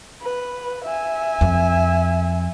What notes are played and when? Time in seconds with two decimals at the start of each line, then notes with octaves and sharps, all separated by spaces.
0.22 B4
0.85 E5 G#5
1.41 F2